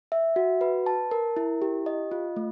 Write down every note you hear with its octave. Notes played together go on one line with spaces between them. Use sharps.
E5
F#4
B4
A5
A#4
E4
G4
D#5
F4
A3